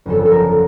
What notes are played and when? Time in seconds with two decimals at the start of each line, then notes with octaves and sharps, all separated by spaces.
0.06 G1 F2 C#3 F#3 A4
0.25 A4
0.31 A#4